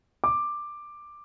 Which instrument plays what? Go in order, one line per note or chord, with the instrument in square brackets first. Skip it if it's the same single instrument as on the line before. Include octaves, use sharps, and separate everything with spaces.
[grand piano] D6